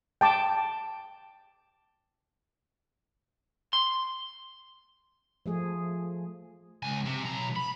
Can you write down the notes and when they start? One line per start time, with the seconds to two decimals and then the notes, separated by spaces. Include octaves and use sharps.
0.21 G5 A5 D6
3.73 C6
5.46 F3 A3 G#4
6.83 C#2 G#5
7.05 C3
7.24 B1 A#5
7.56 B5